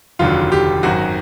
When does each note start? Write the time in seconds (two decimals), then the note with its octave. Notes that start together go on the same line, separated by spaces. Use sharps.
0.19 F1 D#2 D3 F#3 F4
0.52 G4
0.83 G#1 F#2 D#3 F#3 F#4